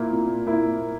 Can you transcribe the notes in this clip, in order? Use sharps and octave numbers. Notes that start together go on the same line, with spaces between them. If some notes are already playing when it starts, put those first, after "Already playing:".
Already playing: A#2 A#3 E4
A#2
A#3 E4